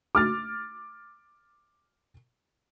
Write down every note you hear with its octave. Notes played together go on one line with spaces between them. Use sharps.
D6 F6 A6